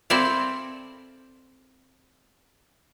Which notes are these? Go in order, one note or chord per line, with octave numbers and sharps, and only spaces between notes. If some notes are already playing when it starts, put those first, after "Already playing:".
C4 E4 A4 C5 D5 F5